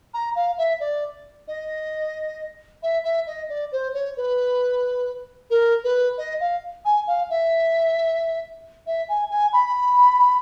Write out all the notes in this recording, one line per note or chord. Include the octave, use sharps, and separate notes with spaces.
A#5
F5
E5
D5
D#5
E5
E5
D#5
D5
C5
C#5
B4
A#4
B4
D#5
F5
G#5
F5
E5
E5
G#5
G#5
B5